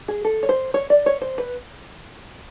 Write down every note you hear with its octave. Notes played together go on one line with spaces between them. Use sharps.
G#4
A4
C#5
C5
C#5
D5
C#5
C5
B4